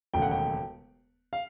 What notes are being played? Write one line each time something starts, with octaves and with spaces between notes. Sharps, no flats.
E1 D#2 C#3 F#3 A3 G5
F#5
G5
F5